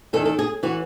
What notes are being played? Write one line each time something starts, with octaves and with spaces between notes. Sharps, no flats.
E2 D#3 A4
A4
G#4
E3 F#4